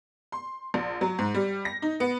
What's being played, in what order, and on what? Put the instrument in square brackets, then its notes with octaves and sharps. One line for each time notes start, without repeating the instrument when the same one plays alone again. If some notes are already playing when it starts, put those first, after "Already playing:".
[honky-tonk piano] C6
A#1
F#3
G#2
G3
A#6
D#4
B3